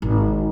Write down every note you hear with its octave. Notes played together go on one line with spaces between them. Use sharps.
G#1